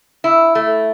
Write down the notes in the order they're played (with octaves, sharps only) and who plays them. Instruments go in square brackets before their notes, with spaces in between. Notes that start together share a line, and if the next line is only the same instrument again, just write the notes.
[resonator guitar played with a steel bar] E4
A3